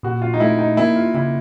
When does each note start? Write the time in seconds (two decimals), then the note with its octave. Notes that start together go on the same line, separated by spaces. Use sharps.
0.03 A#2 F#4
0.22 F4
0.34 D#4
0.40 A3 E4
0.59 D#4
0.77 A#3 E4
0.96 F4
1.14 C#3 E4